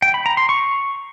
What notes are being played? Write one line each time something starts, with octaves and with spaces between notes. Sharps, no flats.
G5
B5
A#5
C6
C#6